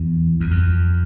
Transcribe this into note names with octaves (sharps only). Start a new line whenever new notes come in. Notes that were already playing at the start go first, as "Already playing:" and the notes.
Already playing: E2
E2
F2